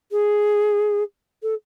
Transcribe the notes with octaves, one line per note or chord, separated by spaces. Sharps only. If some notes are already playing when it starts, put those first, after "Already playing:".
G#4
A4